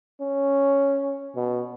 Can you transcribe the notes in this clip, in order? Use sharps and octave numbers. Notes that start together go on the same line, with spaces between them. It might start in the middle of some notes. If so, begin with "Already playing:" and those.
C#4
B2